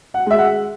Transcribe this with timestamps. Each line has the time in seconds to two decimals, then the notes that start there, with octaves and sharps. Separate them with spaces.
0.14 F#5
0.27 G#3 E5
0.38 F#5